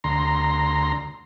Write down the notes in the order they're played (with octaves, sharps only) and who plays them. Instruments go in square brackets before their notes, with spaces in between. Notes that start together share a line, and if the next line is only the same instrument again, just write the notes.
[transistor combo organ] D2 A#5 C6